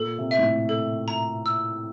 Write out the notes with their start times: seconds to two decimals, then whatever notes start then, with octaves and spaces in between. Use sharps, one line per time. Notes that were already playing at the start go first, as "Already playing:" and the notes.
Already playing: A#2 A4
0.18 C3
0.31 E5
0.39 A2
0.43 A#2
0.69 A4
1.08 A#5
1.46 E6